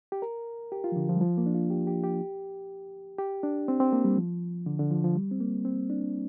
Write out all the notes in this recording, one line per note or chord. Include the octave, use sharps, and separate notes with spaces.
G4
A#4
G4
F4
F3
D3
F3
G3
F3
A#3
D4
F4
G4
G4
G4
G4
D4
C4
C4
A#3
G3
F3
D3
D3
F3
F3
G3
C4
A#3
C4
D4